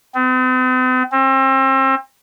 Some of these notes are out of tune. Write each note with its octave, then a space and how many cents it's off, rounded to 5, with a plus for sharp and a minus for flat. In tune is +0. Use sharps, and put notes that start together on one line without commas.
C4 -45
C4 +35